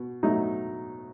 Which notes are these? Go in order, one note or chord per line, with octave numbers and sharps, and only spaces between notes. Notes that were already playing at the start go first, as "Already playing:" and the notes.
Already playing: B2
B2 F#3 A3 D#4